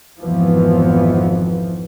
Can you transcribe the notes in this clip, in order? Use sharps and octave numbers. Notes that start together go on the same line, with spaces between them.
G#1 F2 E3 F3 B3